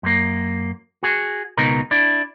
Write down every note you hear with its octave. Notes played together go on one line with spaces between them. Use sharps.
F#2 A#3
F#4 G#4
C#2 B2 D#4 A#4
D4 E4